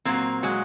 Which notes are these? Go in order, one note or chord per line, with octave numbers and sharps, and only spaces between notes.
A#2 F#3 A#3 C4
F#3 G#3